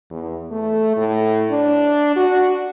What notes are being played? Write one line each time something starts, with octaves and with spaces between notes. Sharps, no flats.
E2
A3
A2
D4
F#4